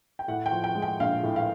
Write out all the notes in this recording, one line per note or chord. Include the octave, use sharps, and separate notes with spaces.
G5
A2 F#5
G5
F3
G5
G#3
G5
A#1 F5
A2
F5